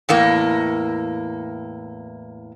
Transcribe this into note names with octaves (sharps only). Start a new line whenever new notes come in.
E2 A2 A#3